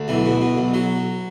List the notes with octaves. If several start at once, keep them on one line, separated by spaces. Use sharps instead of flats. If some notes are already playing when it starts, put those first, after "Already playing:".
Already playing: D2
B1 E3
B2
B2
B1
F#3